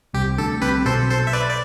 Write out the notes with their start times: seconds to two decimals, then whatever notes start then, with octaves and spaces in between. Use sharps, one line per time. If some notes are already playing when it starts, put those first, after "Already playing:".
0.14 C2 C3 G4
0.38 D2 D3 A4
0.61 C2 C3 G4 B4
0.86 B1 B2 A4 C5
1.10 A4 C5
1.27 E5
1.33 B4 D5
1.49 D5